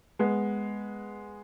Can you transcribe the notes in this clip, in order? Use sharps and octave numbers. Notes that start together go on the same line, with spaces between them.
G#3 B3